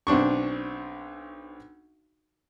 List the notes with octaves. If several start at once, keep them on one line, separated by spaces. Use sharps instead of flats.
B1 C4 D4 C#6